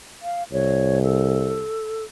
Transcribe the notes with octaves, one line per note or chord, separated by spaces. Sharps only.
F5
C2 C#5
A4